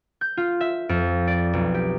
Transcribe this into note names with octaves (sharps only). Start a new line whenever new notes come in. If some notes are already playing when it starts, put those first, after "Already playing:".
G6
F4
E5
F2
D5
B1
G4